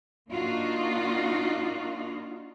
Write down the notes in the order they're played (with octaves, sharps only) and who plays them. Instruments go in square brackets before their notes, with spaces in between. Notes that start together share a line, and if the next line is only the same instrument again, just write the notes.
[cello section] A#3 D4 D#4 F4 F#4